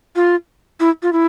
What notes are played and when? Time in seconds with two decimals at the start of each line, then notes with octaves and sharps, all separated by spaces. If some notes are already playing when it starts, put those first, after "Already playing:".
0.16 F4
0.80 E4
1.03 F4
1.13 E4